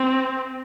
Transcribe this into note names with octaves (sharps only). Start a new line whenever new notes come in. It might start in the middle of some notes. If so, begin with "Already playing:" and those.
Already playing: C4